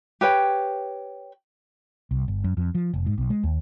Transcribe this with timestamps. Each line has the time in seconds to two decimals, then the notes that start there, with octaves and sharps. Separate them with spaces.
0.21 G4 B4 C#5 G5
2.11 C2
2.28 G1
2.44 F#2
2.57 F2
2.75 F3
2.93 F1
3.06 G#2
3.18 B1
3.30 G#3
3.43 D#2